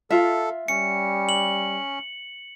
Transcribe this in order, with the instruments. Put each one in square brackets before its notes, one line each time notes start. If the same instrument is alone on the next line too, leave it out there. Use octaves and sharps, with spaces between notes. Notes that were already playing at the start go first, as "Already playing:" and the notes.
[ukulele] F4 E5 [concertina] A4
[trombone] G3 [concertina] C#4 [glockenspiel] C#7
[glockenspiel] F#7